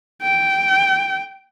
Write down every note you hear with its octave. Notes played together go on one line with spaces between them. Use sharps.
G5